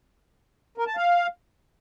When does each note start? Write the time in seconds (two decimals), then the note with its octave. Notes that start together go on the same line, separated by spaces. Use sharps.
0.78 A#4
0.87 A5
0.97 F5